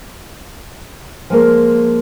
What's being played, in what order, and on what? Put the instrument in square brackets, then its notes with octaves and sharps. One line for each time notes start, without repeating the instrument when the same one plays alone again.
[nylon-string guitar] F3 G#3 A#3